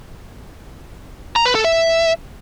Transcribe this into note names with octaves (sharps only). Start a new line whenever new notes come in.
A#5
B4
A4
E5